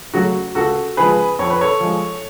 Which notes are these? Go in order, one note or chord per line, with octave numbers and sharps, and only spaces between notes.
C#3 F#3 A3 F#4
C#2 F#4 A4
C#3 F3 G#3 G#4 B4
F2 C#5
B4
A4 C#5
F3 G#3